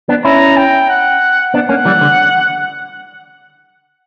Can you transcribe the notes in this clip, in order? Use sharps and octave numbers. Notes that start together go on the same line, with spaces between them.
B3 D4
C#4 E4 A#5
G5
F#5
B3 D4 F#5
A#3 C#4
E3 G3
D3